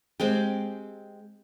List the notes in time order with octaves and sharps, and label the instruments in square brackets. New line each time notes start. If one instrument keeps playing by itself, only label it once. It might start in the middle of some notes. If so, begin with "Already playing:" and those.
[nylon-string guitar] G#3 C4 G4